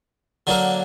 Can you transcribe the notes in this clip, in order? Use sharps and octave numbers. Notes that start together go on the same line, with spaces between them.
D3 F#3 A#3